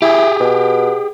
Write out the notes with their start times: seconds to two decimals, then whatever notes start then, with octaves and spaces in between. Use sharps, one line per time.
0.02 E4 G4 G#4
0.40 B2